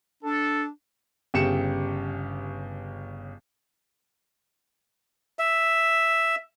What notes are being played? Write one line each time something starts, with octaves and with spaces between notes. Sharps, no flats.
D4 A4
G1 C#3 G4 C#7 E7
E5